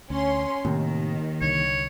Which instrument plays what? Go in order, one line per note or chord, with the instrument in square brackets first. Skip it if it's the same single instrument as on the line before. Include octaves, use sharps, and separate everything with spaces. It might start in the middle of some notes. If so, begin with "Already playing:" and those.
[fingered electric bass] D2 [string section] C#4 C6
[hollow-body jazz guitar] D#2 [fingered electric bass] A2 C3 [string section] D#3
[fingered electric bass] C2 D3 [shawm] C#5